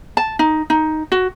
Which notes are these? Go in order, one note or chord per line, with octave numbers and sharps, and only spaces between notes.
A5
D#4
D#4
F#4